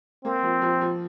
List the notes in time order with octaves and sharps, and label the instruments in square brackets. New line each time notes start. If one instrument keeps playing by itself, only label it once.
[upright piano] A#3 [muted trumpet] C4
[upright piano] F3
F3
F3